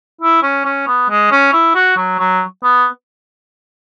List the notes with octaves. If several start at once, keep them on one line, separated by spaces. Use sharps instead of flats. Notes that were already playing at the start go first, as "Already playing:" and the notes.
E4
C#4
C#4
B3
G#3
C#4
E4
F#4
F#3
F#3
B3